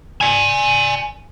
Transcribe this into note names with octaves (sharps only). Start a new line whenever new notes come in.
D5 G#5